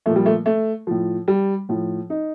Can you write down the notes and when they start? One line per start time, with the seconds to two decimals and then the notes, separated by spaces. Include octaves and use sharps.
0.06 A#2 F3 A3
0.16 G3
0.26 A3
0.46 A3
0.87 A2 F3
1.28 G3
1.69 A2 F3
2.10 D#4